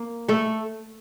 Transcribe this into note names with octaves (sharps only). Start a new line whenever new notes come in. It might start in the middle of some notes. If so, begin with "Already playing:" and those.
Already playing: A#3
A3 A4